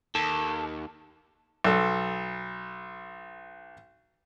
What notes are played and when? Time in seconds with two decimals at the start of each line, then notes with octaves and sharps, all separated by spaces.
0.15 D#2 A4
1.65 B1 A4